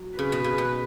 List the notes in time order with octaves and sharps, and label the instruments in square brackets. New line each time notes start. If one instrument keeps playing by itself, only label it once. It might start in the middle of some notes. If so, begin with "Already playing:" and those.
Already playing: [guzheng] F#3
[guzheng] C#3 [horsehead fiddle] B4
[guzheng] B2
C#3
B2